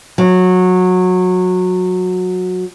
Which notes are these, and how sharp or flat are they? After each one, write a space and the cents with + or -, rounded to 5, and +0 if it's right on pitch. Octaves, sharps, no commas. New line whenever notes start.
F#3 -20